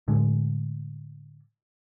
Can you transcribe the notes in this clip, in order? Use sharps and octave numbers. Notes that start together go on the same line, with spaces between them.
A2 D3 G#3